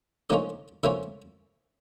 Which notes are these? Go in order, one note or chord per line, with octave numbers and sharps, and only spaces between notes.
D3 F3 A#3 C#4 D#4 F4 D#5
D3 F3 A#3 C#4 E4 F4 E5